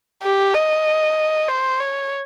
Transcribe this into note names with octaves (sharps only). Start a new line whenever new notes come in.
G4
D#5
C5
C#5